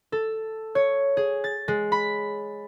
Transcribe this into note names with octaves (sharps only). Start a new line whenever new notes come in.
A4
C#5
G#4
A6
G#3
B5